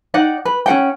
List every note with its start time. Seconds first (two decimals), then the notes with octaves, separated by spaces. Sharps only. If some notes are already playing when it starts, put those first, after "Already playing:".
0.14 D#4 D5 F#5 G5
0.45 B4
0.66 C#4 A4 F#5 G5